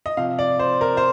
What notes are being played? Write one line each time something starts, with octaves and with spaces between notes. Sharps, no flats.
D#5
C3 F3 F5
D5
C5
A#4
C5